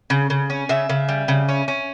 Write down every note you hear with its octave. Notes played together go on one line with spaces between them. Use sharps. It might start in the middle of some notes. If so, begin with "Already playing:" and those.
C#3
C#3
C#4
C#3 E5
C#3
G3
C#3
C#4
C#4